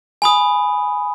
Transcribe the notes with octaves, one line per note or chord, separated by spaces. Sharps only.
G#5 B5 D#6